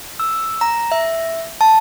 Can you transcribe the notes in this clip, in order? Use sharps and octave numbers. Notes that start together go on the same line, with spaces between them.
E6
A#5
E5
A5